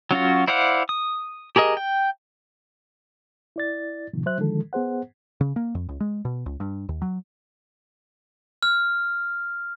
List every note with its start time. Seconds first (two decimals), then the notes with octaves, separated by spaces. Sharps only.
0.11 F#3 C#4 F4 F#4
0.48 E4 C5 D5 F5 F#5
0.89 D#6
1.56 G4 G#4 A#4 D#5
1.77 G5
3.56 E4 D5 A6
4.13 F#2 A2 C3 D#3 F3
4.26 F#3 C5 E5 F#6
4.38 D3 D#3 F3 G#3 A4
4.73 B3 G#4 C5 F#5
5.41 C#3
5.56 A#3
5.75 F2
5.89 C#2
6.00 G#3
6.25 B2
6.46 C#2
6.60 G2
6.89 D#2
7.02 F#3
8.63 F6